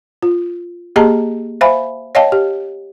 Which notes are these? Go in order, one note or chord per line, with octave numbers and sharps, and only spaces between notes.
F4
A#3 G4 G#4 D#5 A5 A#5
C5 E5 F5 G#5 B5
C#5 D#5 F5 G5 A5
G4